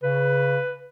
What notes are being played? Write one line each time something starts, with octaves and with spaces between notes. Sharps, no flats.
C#3 B4